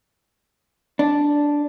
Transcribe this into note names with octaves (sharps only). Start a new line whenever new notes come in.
D4